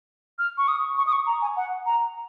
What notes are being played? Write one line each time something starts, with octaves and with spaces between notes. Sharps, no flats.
F6
C#6
D#6
C#6
D#6
C#6
A#5
G#5
F#5
A#5